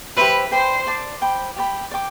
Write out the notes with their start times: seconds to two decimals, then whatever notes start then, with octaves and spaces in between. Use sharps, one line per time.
0.16 G4 B4 C5 E5 B5
0.51 B4 C5 D5 G5 B5
0.87 D5 A5 D6
1.21 C5 G5 B5 D6
1.56 G4 D5 G5 B5
1.91 D5 G5 D6